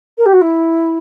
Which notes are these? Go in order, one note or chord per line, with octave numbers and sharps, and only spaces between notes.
A#4
G4
F#4
E4